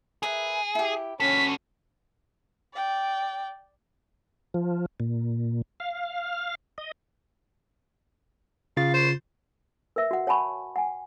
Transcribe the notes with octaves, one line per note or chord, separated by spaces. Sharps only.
G#4 A#4 B4 E5
E4 G4
C#4 F#4 A4 B4 B6
D5 G5
F3
A#2
F5
D#5
C#3 F4 F5 A6
C5
A#4 B4 E5 E6
F#4 F#5
C#5 F#5 G#5 A5 B5 C#6
F#5 G#5